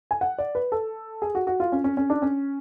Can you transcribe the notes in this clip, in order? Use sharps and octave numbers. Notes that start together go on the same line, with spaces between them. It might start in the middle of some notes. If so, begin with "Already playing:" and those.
G#5
F#5
D5
B4
A4
G#4
F#4
F#4
F4
C#4
C#4
C#4
D4
C#4